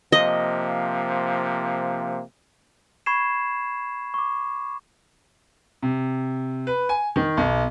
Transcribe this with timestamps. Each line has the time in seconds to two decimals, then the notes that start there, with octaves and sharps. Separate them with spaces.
0.12 C3 F3 A#3 D#5
3.06 B5 C#6 G#6 C7 E7
4.14 C#6 D6
5.82 C3
6.67 B4
6.89 G#5
7.16 D#3
7.37 B1